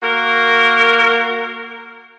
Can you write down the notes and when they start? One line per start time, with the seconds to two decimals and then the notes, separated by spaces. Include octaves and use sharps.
0.03 A#3 F#4 A#4